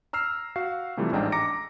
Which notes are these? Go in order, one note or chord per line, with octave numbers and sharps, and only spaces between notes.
A#5 E6 F6 C7
F#4 F5 C7
C3 E3 F3 G3 A3
A1 G#2 D4 G5 A#5
A#5 D6 A#6 C#7 D7